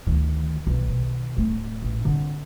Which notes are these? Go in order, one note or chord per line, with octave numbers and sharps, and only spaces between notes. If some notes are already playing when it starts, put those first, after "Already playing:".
D2 D#3
B1 E3
B2 D#3
D1 A3
A1
D3 C4